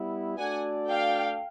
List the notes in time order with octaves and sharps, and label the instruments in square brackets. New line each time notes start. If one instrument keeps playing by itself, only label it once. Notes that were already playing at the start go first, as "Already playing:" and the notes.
Already playing: [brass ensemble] G3 B3 E4
[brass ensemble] A3 D4 F#4 A4 D5 [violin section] F#5 G#5
[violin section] F5 G5